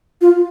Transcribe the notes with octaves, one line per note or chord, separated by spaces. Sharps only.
F4